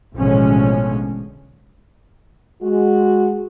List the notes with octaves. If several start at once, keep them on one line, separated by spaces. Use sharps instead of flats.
A1 B2 D3 F3 G#3 C#4
G#3 F#4